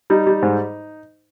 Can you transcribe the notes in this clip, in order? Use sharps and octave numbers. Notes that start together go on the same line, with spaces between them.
G3 D#4
G3
G#2